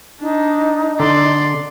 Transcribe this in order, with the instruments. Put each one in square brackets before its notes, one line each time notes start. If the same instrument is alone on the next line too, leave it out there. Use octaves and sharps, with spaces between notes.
[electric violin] D4 [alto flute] D#4
[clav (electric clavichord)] D3 [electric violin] D5 C6